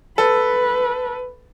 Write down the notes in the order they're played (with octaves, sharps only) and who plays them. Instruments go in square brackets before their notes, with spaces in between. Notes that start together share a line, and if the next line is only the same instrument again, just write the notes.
[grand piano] A4 [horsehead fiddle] B4